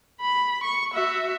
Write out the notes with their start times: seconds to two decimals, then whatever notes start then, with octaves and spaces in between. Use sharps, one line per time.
0.21 B5
0.64 C#6
0.94 F#4 E5